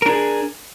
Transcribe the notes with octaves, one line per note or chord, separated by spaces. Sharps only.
D4 G#4 A#4